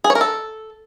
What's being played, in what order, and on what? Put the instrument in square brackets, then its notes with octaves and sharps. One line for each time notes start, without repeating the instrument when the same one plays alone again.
[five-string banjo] G#4
C#5
A#4
A4